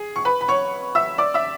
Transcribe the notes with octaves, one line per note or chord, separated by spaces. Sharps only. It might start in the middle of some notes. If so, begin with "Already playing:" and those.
Already playing: G#4
C#6
B4 B5
B5
C#5 C#6
E5 E6
D5 D6
E5 E6